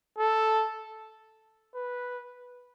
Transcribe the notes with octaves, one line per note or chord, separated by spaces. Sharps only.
A4
B4